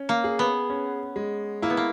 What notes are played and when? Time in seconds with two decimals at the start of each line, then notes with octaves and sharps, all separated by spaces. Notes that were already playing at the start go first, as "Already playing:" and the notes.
Already playing: C#4
0.09 A#3
0.24 G#4
0.39 B3
0.70 C#4
1.16 G#3
1.62 A#3 E4
1.70 B3
1.77 A#3